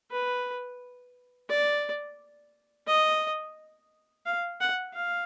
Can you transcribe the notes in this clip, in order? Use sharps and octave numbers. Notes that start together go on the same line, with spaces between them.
B4
D5
D#5
F5
F#5
F5